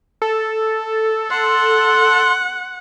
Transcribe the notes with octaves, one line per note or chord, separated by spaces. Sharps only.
A4
F#5 C6